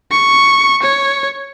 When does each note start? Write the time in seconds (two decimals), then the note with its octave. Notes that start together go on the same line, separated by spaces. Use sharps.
0.11 C#6
0.82 C#5